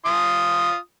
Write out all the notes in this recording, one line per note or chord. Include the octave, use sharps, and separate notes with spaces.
F4 C6 D#6